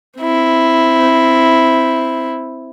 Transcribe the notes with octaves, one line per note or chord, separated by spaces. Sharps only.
C4 E4